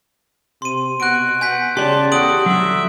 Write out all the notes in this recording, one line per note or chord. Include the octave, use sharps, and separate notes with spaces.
C3 C6 D#7
B2 F#4 F#6 D7
F#5 G#5 G6 B6
C#3 G4 D5 A5 C6
E2 F#4 A4 D#6 D7 F#7
D3 F#3 E5